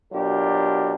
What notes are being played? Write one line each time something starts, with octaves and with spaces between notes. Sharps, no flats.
B2 F#3 D4 F4 G4 A#4